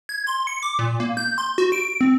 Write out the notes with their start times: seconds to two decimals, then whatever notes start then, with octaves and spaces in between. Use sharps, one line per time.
0.09 G#6
0.27 C6
0.47 C#7
0.63 D6
0.79 A#2
1.00 A#3
1.17 G6
1.38 C6
1.58 F#4
1.72 D7
2.01 C4